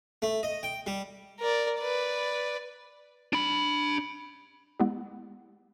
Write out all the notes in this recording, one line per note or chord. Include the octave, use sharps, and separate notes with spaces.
A3
D#5
G5
G3
A#4 D5
B4 D5
D4 B5
G#3 B3 E4 G4